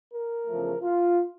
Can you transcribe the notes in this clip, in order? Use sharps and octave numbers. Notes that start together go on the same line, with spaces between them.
A#4
E2 C#3 F3 A3
F4